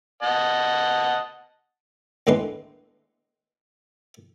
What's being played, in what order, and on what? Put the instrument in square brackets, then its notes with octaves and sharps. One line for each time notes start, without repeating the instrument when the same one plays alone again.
[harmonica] D#5 F#5 A5
[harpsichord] D#2 A2 G#3 D4 B4 C6